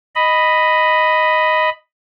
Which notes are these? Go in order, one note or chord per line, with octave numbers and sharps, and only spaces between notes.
D#5 B5